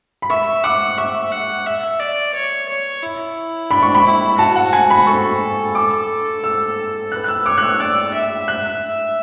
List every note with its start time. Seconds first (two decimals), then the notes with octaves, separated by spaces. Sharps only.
0.22 B5
0.30 E5 C#6
0.64 F#5 D6
0.98 E5 C#6
1.32 F#5
1.66 E5
2.00 D5
2.35 C#5
2.68 C#5
3.03 E4
3.70 D4 B5
3.83 C#6
3.95 B5
4.05 E4
4.39 F#4 A5
4.56 F#5
4.73 G#5
4.90 B5
5.07 A4 C#6
5.75 D6
6.44 E6
7.12 B4 F#6
7.24 F#6
7.28 E6
7.46 C#5 D6
7.58 F#6
7.63 E6
7.80 D5 E6
8.14 E5
8.48 F#6